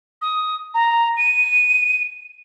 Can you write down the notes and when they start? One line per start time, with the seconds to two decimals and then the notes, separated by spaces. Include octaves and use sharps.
0.22 D#6
0.74 A#5
1.17 D#7